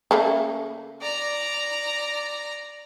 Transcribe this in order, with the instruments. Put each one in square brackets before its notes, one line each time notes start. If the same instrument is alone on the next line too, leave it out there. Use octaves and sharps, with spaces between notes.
[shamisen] C#3 A3 A#3
[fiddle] D5 A#5